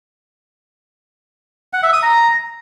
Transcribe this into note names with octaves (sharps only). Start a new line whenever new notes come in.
F#5
E5
D#6
A#5